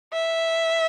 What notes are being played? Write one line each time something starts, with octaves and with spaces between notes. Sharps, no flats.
E5